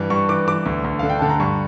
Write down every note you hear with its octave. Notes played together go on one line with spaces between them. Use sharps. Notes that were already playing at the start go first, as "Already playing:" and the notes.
Already playing: G2 E3
G2 C#6
E3 D6
E3 D6
D2
D2
D3 F5
G5
D3 A5
A#5
G2 C#6